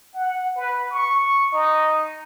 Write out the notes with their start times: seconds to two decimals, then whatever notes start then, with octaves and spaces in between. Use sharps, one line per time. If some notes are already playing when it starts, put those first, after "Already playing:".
0.14 F#5
0.56 B4
0.91 C#6
1.52 D#4